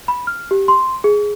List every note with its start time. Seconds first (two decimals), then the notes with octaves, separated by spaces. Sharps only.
0.08 B5
0.27 F6
0.51 G4
0.68 C6
1.04 G#4